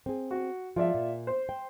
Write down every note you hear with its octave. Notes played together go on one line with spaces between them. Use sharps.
C4 G#4
F#4
F3 G#3 F4 D5 E5
A#2
C5
G5